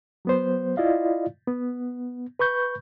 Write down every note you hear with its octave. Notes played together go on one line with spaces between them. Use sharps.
F#3 B3 C5
E4 F4 D5 D#5 F5
B3
B4 B5 C#6 G6